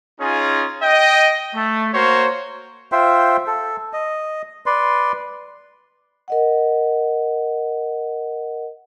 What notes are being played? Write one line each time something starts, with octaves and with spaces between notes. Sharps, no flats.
C#4 D#4 F4 G#4
D#5 G5
A3
A#3 F#4 C5 C#5
F4 C5 E5 G5
A4
D#5
B4 D5 C6
A#4 D#5 F#5